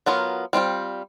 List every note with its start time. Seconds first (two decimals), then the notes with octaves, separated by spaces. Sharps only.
0.06 F#3 B3 F4 A#4
0.53 G3 C4 F4 G5